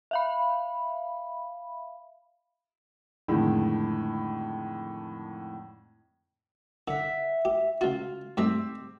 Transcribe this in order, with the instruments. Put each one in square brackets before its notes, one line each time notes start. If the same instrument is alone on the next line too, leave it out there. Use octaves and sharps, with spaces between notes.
[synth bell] E5 F5 B5
[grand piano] F2 A2 D3 D#3 G#3 E4
[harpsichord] D3 [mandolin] E5 F#5
[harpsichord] G4
[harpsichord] C#2 F#4 [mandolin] F4
[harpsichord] G#2 G3 A3 [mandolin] C4 G4 E6